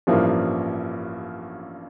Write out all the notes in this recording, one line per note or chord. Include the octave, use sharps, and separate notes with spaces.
A1 G2 F3 A#3 E4